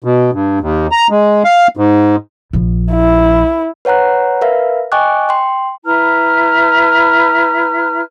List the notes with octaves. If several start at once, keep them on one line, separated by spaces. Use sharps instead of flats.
B2
G2
D#2
A#5
G#3
F5
G#2
A#1 F3
E4
B4 C#5 F#5 A#5 F#6
A#4 B4 E5 F5
D#5 G5 G#5 C#6 D6 F#6
G5 C6
E4 B4 A#5 F6